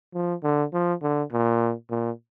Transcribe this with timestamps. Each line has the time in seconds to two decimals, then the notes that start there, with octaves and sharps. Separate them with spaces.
0.14 F3
0.43 D3
0.73 F3
1.02 D3
1.32 A#2
1.90 A#2